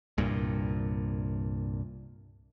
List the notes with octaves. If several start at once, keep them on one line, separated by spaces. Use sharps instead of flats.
C2 G2 A#2